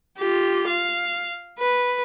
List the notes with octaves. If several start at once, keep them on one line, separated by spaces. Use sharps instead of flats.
F4 G4
F5
B4